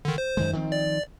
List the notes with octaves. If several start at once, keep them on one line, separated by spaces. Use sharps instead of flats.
D3 D#3
C5
F#2 D#3 G#3
D#3 F3 C4
D5